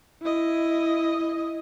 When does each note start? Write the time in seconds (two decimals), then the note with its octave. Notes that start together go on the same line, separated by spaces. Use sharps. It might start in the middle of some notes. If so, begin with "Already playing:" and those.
0.22 E4 D#5